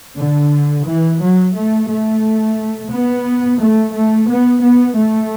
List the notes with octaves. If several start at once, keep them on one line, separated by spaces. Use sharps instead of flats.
D3
E3
F#3
A3
A3
B3
A3
A3
B3
B3
A3